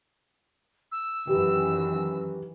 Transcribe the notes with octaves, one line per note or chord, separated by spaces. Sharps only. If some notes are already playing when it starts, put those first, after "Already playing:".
E6
F#2 D#3 E3 G4